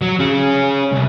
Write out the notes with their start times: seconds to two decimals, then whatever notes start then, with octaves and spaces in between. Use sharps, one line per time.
0.02 F#3
0.20 C#4 G#4
0.92 C2